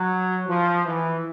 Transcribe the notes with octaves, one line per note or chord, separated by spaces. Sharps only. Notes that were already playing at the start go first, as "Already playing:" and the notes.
Already playing: F#3
F3
E3